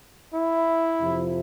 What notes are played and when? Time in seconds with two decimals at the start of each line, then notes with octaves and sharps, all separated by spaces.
0.33 E4
1.00 F2 C3 F3